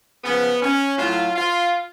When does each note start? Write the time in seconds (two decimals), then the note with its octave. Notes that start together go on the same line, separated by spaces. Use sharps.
0.24 C#3 F3 B3
0.62 C#4
0.98 A2 F#3 F4
1.36 F4